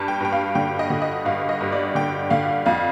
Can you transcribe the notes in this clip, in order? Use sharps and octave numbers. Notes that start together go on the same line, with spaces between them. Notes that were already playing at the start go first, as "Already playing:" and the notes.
Already playing: G2 A5
G5
G2 G5
F5
D3 G5
D#5
D3
D#5
G2 F5
D#5
G2
D5
D3 G5
D3 F5
F2 F5